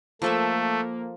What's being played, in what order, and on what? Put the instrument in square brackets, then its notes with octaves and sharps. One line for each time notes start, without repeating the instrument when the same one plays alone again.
[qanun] F3 A4 E5 [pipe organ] A3 [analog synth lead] A#3